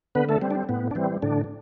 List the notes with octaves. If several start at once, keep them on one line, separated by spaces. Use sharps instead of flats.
D3 B3 B4
A3 A4
G3 C4
D4
C4
A2 B3
D4
E3 G3 C4
A2 D3 D4